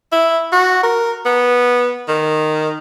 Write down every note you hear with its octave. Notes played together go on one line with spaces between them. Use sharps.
E4
F#4
A#4
B3
D#3